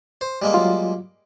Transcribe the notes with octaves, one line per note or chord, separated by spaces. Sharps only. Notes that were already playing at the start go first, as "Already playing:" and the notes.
C5
G3 G#3 A#3
F#3 F4